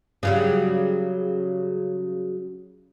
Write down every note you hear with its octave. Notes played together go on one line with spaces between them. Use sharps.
C#3 F#3 G3